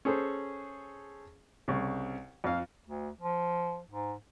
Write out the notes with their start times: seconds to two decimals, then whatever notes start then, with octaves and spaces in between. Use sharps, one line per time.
0.05 C#4 G#4 A4 C5
1.68 C2 C#3
2.44 F2 F5
2.87 D2
3.21 F3
3.91 G#2